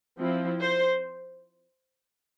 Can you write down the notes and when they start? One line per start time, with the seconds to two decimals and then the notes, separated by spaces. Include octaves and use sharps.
0.18 F3 C4 E4
0.59 C5